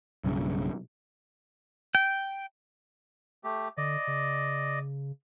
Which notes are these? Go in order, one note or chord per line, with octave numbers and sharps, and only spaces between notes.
B1 G2 C#3
G5
A3 G4
D3 D5 D#5
C#3